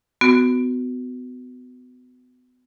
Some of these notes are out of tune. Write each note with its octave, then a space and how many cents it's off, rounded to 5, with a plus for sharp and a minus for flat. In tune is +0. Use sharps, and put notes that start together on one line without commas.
B3 +30 F#4 +0